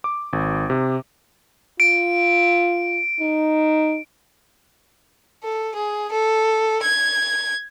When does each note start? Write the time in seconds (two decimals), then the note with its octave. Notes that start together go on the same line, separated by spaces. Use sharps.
0.04 D6
0.33 G#1
0.70 C3
1.80 F4 D7
3.20 D#4
5.43 A4
5.74 G#4
6.12 A4
6.83 G#6